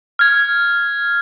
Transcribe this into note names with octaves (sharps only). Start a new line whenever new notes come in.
F6 G#6